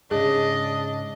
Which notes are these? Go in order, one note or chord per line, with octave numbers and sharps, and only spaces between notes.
G#2 C#3 D4 G#4 D#5